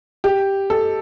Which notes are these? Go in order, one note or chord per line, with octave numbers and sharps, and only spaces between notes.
G4
A4